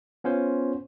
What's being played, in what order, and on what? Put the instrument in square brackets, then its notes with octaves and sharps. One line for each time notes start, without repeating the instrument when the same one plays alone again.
[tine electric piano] B3 C#4 F4 C5